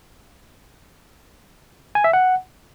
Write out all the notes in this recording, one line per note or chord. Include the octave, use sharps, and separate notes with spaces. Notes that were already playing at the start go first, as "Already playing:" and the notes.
G#5
E5
F#5